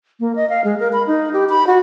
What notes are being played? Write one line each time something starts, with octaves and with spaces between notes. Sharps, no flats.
A#3
D#5
F5
G#3
A#4
B5
D#4
G4
B5
F#4